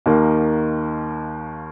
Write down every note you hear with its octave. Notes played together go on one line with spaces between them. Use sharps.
D#2 D#3 A#3